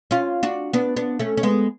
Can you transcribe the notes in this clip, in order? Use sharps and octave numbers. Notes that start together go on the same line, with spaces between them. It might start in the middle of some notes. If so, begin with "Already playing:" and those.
C#4 F4
D4 F#4
B3 D4
B3 D4
A3 C#4
C#4
G#3 B3